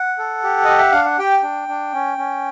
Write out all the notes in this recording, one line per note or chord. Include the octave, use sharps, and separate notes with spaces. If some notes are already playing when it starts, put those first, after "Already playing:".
Already playing: F#5
A4
G4
G4 D#5
E5
D4 F5
F#5
G4 G5
D4
D4
C#4
C#4